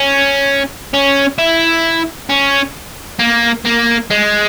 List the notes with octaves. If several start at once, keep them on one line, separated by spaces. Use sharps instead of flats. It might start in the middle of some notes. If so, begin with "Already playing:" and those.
Already playing: C#4
C#4
E4
C#4
A#3
A#3
G#3